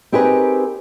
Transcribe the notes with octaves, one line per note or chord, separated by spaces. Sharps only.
C4 D#4 G4 G#4 A#4 B4